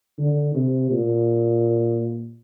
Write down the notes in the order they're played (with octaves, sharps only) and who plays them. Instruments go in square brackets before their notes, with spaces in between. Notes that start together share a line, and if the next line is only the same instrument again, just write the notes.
[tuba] D3
C3
A#2